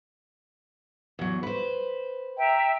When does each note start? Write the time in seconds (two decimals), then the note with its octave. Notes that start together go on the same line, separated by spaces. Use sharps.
1.19 E2 F#3
1.43 B4 C5
2.37 E5 G5 A#5